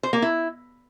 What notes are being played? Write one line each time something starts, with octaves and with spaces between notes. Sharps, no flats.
C5
A#3
E4